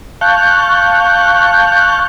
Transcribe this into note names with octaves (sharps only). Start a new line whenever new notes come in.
F5 A5 C#6 F#6 G6